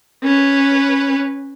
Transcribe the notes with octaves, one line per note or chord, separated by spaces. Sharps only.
C#4 B4